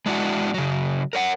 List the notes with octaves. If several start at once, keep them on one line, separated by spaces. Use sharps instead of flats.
G#3 D4 E4 F#4
C#3 F#3
A#4 C#5 F#5